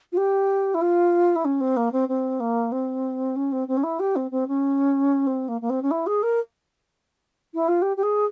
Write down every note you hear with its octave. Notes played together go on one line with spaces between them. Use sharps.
F4
G4
E4
F4
E4
C#4
C4
A#3
C4
C4
A#3
C4
C#4
C4
C4
C#4
E4
G4
C4
C4
C#4
C4
A#3
A#3
C4
C#4
E4
G#4
A#4
E4
F4
G4
G4
G#4